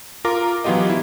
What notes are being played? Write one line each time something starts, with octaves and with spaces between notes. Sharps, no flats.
F4 A#4 A#5 D6
E3 F#3 B3 F4 G4 D#5
E4